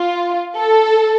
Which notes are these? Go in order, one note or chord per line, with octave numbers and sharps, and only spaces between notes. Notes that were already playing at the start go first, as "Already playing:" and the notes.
Already playing: F4
A4